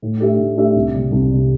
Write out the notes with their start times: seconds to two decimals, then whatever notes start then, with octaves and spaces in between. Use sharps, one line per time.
0.02 A2
0.20 A3 D4 G4 E5
0.39 A2
0.57 A3 D4 G4 E5
0.76 C2
0.94 C3 G3
1.11 C2
1.30 C3 G3